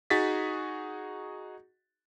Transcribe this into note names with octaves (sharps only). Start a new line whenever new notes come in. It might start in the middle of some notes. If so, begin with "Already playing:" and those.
D#4 F#4 G#4 A6 B6